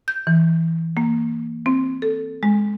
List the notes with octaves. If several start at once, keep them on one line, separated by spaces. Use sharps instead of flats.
G6
E3
A#3
C4
A4
G#3